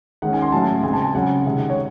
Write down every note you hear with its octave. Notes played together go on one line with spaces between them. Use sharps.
D#3 G#3 C#4 F#5
G#5
C6
A2 F#3 C#4 A5
C#3 G#3 C4 G#5
A5
G#5
C#3 F#3 C#4 F#5
C3 D#3 G#3 C#4
C#5